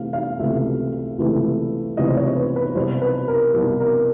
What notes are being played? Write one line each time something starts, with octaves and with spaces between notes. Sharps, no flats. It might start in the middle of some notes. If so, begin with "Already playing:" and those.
Already playing: C3 E3 A3 F5
F5
C#2 C3 E3 A3 E5
C#2 C3 E3 A3
C#2 C3 E3 A3 D#5
C5
C#5
B4
B4
C2 B2 F#3 C5
B4
A#4
C2 B2 F#3
A#4